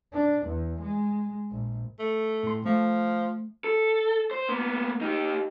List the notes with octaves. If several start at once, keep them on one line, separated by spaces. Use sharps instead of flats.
D4
E2
G#3
A#1
A3
A2 C6
F3 A3
A4
C5
A#3 B3
D#4 G4